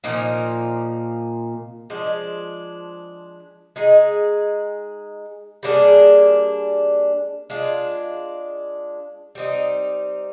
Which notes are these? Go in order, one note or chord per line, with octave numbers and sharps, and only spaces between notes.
A#2 F3 A#3 D#4
F3 G#3 D4
G#3 D#4 G#4
G3 A#3 D4 G#4
G#3 D4 F4
G3 C4 D#4